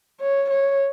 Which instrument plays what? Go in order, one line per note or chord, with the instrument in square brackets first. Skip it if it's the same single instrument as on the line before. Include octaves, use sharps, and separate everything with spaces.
[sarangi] C#5
C#5